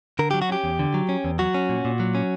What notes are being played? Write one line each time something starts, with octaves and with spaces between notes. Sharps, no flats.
D3 A#4
F#3 G4
F#4
C#4 G4
E2
D3
F#3
C#4
E2
F#3 F#4
C#4
A#2
A#2
F#3
C#4